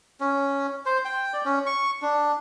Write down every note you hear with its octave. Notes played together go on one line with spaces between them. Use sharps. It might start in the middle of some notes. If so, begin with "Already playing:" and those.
C#4
C5
G5
D5
C#4
C#6
D4